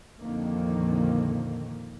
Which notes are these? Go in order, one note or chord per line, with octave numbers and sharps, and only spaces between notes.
A#1 F2 D3 D#3 F3 A#3